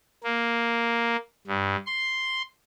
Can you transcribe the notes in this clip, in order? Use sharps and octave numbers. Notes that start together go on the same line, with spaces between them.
A#3
G2
C6